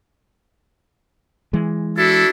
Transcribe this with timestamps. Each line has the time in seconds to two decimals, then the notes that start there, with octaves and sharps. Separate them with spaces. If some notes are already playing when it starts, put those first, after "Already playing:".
1.53 E3 G#3
1.97 D4 E4 F#4 A4